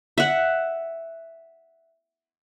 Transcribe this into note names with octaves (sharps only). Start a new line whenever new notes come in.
E5 F#5